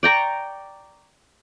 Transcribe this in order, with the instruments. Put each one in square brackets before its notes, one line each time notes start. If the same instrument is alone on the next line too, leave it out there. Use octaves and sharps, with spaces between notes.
[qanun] D5 G5 A#5 C#6